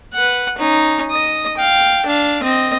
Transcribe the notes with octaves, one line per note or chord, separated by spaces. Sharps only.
B4 F#5
C#4 D#4
D#5 D#6
F5 G5
D4 F5
C4 D#5